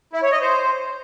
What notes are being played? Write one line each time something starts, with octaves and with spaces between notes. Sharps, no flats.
E4
C#5
D#5
C5